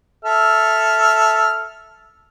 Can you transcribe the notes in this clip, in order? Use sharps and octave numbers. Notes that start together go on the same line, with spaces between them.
A4 E5 F6